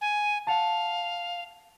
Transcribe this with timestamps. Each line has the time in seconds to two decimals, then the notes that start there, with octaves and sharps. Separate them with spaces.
0.01 G#5
0.47 F5 F#5 A5